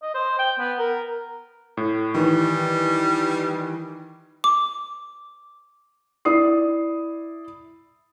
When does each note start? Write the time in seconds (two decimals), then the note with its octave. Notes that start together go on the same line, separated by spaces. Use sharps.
0.02 D#5
0.15 C5
0.39 G5
0.59 B3
0.79 A#4
1.77 A2
2.14 D#3 E3 G3
4.44 D6
6.25 E4 D5 D#6 C7